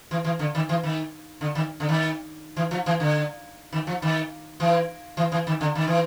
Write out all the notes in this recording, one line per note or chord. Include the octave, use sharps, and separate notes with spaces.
E3
E3
D3
D#3
E3
D#3
D3
D#3
D3
D#3
E3
F3
E3
D3
D#3
F3
D#3
E3
E3
E3
D#3
D3
D#3
E3